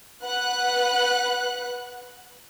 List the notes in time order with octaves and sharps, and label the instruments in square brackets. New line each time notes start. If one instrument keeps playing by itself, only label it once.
[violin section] B4 F#5 F#6